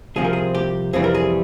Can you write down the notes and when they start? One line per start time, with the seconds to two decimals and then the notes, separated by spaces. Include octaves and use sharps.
0.16 C2 C3 F3 C4 G#4
0.24 A#4
0.33 G#4
0.55 G4
0.93 F2 C3 E3 G3 G#4
1.04 A#4
1.15 G#4